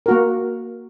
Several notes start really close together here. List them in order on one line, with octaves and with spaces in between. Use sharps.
A#4 F#4 A#3